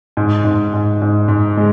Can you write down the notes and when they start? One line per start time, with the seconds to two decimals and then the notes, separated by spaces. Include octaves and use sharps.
0.17 G#2
0.44 G#2
0.73 G#2
1.02 G#2
1.28 G#2
1.57 G#3